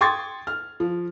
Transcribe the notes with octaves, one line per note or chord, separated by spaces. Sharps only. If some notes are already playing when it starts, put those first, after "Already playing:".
G5 C6 C#6 D#6 G#6 A6
F6
F3